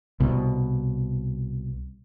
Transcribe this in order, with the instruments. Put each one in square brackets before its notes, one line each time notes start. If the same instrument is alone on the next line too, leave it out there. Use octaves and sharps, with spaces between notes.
[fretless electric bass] C2 B2